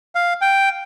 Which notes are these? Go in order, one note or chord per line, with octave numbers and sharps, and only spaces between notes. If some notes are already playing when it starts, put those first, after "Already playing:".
F5
G5